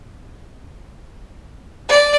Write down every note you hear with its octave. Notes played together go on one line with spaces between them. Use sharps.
D5